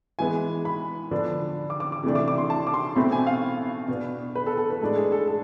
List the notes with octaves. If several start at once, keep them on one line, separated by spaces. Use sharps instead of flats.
E3 G#3 B3 G#5
B5
D3 F3 B3 D4
D6
D6
D6
C3 E3 A3 D4
D6
D6
C6
A5
D6
C6
B2 A3 C4 B5
G#5
F5
B2 B3 D4
B4
A4
A4
B4
A2 G#3 D4 A4
G#4
A4
A4